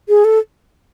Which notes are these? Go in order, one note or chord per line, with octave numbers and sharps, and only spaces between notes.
G#4
A4